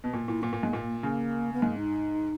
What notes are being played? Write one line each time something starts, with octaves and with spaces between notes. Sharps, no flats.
B2
A#2
A#2 E4
A#2 A#3
A#2
G#2
A#2
C#3 A#3
B3
G#2 A#3
D#4